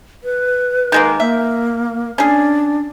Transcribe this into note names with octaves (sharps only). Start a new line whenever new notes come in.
B4
D#3 G#3 A#3
A#3 E5
C#4 D4 G#4